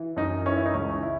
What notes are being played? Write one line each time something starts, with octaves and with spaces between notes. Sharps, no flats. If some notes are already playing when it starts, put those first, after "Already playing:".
Already playing: E3
F#2 D#4
E3 C#4
E4
D#4
C#2 C#4
E4